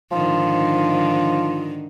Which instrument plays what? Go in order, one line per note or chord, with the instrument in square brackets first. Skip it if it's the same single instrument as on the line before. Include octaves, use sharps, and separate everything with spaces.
[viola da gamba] G#2 D3 D#3 [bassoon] F3